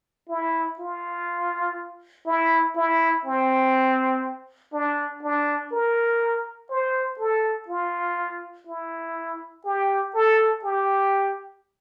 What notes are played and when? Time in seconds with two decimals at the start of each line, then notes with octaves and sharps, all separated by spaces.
0.29 E4
0.79 F4
2.27 E4
2.76 E4
3.25 C4
4.73 D4
5.23 D4
5.72 A#4
6.70 C5
7.19 A4
7.68 F4
8.67 E4
9.65 G4
10.14 A4
10.64 G4